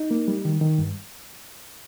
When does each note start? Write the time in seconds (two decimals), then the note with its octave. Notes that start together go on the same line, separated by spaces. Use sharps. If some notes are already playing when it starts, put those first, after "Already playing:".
Already playing: D#4
0.11 A#3
0.28 G3
0.45 D#3
0.61 D#3
0.78 G2